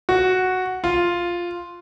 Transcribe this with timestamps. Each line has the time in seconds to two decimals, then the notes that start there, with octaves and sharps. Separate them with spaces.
0.09 F#4
0.84 F4